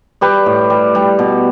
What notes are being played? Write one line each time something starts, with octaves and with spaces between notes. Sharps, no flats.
G3 G4 B4
A2
G3
G3
B2